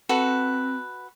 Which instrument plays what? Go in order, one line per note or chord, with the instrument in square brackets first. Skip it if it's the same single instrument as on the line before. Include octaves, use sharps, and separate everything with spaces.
[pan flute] C4 [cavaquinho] F#4 A4 B4